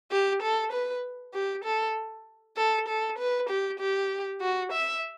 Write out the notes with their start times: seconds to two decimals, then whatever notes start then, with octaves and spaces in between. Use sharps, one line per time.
0.11 G4
0.42 A4
0.72 B4
1.34 G4
1.64 A4
2.57 A4
2.88 A4
3.18 B4
3.49 G4
3.80 G4
4.41 F#4
4.72 E5